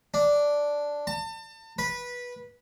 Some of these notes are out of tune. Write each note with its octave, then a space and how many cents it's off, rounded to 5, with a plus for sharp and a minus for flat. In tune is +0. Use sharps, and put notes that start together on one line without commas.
D4 -5
A5 +35
B4 -15